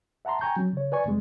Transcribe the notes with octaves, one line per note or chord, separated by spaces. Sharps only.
E5 F#5 A5 A#5 C6
G5 G#5 A#5 C#6 G6
F#3 C#4
C#3 C#5
B4 D5 G#5 C#6
F2 C3 G3 G#3